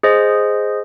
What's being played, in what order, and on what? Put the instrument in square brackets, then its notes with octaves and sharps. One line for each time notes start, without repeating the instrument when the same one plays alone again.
[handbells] G#4 C5 D#5